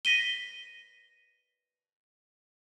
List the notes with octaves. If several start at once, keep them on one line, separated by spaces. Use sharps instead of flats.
A#6 B6 D#7 G7